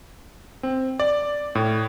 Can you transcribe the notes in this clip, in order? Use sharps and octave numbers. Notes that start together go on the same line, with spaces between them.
C4
D5
A2